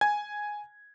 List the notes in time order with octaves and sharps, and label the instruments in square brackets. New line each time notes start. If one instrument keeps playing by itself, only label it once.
[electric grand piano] G#5 G#6